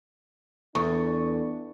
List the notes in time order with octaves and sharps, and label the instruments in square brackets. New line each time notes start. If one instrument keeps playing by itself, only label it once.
[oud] E2 [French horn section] B3 D4 [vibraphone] A4 [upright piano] C#6